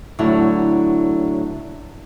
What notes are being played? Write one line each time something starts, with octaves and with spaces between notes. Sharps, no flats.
A2 D3 F#3 E4